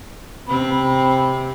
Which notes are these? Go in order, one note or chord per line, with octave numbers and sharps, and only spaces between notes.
C3 C4 B5